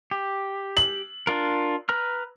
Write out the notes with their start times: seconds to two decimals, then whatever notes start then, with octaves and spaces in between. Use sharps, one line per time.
0.11 G4
0.77 F#7
1.27 D4 F4 A#4
1.89 B4 A#5 F6